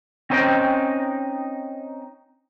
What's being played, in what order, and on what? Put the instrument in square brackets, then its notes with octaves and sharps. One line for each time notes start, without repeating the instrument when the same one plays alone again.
[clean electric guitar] C4 C#4 D#4 C5 D#5 G5